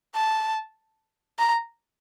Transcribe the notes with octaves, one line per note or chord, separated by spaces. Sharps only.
A5
A#5